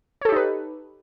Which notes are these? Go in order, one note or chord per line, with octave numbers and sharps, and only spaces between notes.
D#4 G4 A4 B4 C#5